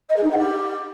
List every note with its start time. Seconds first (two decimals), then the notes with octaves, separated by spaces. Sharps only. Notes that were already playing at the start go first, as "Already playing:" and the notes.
0.09 D#5
0.16 G#4
0.23 D#4
0.30 F#5
0.37 G4